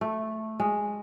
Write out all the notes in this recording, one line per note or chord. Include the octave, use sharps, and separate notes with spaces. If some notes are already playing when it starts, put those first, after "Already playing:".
A3
G#3